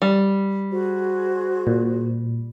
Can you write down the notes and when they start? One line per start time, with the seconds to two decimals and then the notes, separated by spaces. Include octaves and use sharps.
0.02 G3
0.72 F#4 G#4 C5
1.67 A#2